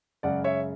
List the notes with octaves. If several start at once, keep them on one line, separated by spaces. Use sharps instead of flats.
F#2 C#3 G#3 D5 F#5
C#5 E5